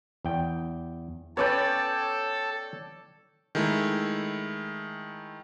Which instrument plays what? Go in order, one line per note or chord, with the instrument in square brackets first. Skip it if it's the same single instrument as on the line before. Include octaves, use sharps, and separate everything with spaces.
[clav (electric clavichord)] E2 G5
[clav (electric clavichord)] B3 C#4 B4 [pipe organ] A4 [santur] C#5 D5 G5
[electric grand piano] D#3 G#3 A3 E4